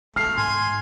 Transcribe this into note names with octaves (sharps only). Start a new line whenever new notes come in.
A3 B3 F6 C7
G#2 G#5 C6